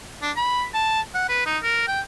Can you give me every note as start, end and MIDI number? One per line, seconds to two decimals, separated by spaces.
0.22 0.31 62
0.37 0.65 83
0.74 1.01 81
1.15 1.25 78
1.29 1.45 71
1.46 1.58 63
1.63 1.87 70
1.88 2.01 79